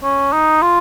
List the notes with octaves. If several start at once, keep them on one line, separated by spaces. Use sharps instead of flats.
C#4
D#4
F4